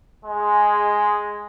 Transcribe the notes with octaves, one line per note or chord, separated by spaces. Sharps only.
G#3